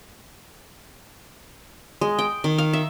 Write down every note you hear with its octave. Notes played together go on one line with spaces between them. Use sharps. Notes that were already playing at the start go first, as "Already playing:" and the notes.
G#3
G5
D#3
F5
E5